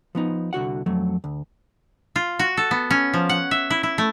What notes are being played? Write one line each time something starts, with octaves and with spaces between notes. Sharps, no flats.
F3 B3 D#4
C2 D3 F#4 F#5
F2 F#3 A3
D2
F4
F#4
A4
B3
C#4
F3
F#5
E5
E4
E4
A3